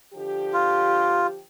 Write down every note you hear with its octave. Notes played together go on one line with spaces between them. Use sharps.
D3 F3 G4
F4